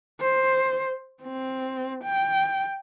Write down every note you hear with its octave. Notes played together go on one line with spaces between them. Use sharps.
C5
C4
G5